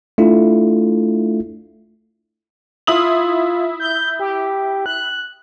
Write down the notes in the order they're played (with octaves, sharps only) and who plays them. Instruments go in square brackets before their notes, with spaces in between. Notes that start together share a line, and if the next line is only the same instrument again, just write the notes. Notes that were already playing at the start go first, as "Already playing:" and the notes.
[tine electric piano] A3 D4 E4 F4
[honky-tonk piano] E4 D#6 F#7 [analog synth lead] F4
[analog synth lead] G6
G4
F#6